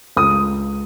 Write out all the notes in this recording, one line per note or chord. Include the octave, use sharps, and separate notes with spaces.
C#2 D#6